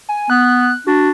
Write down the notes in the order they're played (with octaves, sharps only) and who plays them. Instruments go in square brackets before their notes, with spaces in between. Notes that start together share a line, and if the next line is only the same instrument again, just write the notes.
[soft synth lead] G#5
[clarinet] B3 [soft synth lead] F#6
[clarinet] D4 [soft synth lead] F#4